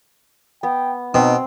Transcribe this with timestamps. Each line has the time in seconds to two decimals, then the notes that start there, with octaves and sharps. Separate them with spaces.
0.63 B3 G5
1.14 B2 C4 D#4